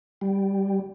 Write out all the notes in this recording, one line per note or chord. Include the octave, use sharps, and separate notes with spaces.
G3